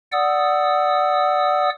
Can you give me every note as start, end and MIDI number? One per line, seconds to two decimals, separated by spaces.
0.12 1.70 74
0.12 1.70 78
0.12 1.70 87
0.12 1.70 88